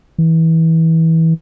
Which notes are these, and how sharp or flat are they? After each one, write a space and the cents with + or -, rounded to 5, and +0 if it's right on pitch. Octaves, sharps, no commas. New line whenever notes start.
E3 -25